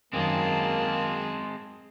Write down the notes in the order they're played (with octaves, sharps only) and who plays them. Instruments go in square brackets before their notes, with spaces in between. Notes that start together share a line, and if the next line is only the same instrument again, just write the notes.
[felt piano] F#2 D#3 [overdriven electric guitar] G#3 C4 [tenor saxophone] A#3 [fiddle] G#4 A5